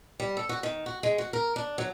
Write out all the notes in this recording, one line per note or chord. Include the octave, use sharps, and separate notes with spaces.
G3
A4
F#4
D#3
F#4
G#3
F#4
A#4
D4
F#3